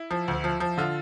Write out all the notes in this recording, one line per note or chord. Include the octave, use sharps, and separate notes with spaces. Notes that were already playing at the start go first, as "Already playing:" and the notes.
Already playing: E4
F3
D2
F3
F3
D3 F4